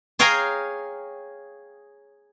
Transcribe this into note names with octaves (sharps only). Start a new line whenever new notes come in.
G#4 C#5 F5 G5 G#5 A#5